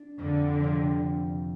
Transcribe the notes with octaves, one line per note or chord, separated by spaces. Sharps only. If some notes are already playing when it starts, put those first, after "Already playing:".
Already playing: D4
F2 D3
C3 F3